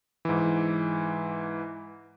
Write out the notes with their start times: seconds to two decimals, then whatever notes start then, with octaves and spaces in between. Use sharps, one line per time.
0.25 G#2 E3